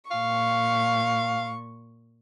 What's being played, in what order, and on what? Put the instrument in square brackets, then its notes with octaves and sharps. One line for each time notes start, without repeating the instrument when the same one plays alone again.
[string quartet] A#2 C#6 [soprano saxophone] F5